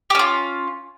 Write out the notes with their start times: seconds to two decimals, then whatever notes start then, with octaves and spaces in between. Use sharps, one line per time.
0.10 G4
0.15 C#4
0.19 F4